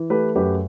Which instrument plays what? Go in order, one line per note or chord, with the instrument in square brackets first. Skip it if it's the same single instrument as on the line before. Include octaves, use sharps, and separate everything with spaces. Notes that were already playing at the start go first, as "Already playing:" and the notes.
Already playing: [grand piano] E3
A3 G4 B4
F#2 G4 B4